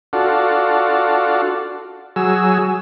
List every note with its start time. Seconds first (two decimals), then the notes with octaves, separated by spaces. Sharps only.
0.13 D4 F4 F#4 A4
2.16 F#3 G#4 E6